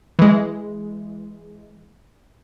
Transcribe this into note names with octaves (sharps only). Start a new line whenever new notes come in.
E3 G#3